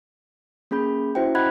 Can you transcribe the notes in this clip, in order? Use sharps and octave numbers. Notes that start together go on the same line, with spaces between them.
A#3 C#4 G#4 B5 G6
C#4 E4 F#4 C5 E5 G5
D#5 F#5 B5 F#6 G#6 B6